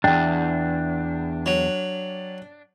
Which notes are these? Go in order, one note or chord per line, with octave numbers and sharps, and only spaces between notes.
E2 G2 D4 G5
F#3